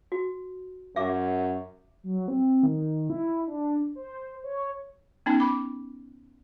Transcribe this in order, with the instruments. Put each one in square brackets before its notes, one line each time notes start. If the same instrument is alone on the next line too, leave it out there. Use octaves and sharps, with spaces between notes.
[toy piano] F#4
[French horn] F#2 [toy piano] E5 D6
[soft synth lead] F#3
C4
D#3
E4
D4
C5
C#5
[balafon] B3 C#4 D#4
B5 D6